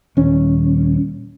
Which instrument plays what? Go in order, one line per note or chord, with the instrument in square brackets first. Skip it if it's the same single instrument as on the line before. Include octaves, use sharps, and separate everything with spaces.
[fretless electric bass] D#1 C#4